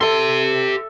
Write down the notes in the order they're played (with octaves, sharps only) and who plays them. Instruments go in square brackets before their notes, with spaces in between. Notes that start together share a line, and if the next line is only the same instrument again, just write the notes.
[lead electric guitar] G4 C6 [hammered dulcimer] A4 E5